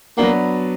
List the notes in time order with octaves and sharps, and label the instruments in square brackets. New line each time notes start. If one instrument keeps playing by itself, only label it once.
[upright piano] F#3 B3 D4 F#4 [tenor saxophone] A#3